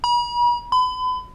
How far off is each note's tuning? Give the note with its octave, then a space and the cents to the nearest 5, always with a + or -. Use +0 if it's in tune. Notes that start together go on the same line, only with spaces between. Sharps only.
B5 -45
B5 +35